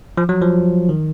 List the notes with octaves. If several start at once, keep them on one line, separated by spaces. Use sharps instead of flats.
F3
F#3
F3
D#3